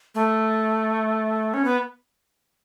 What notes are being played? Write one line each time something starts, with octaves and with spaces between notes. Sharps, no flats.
A3
C#4
B3